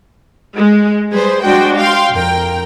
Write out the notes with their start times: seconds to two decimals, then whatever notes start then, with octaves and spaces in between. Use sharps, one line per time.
0.57 G#3
1.11 G3 G#4 B4 C5
1.44 G#3 D4 F#4 C5 G5
1.77 F5 G5 C6
2.12 F2 A#4 G5